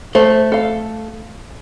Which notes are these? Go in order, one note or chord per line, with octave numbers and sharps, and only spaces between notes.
A3 C5
A4 F5